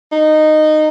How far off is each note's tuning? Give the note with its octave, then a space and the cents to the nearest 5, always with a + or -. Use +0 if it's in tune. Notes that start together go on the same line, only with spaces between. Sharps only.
D#4 -15